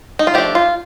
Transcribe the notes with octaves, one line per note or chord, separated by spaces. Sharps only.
D#4
F4
F3 A3 D4 G4
F4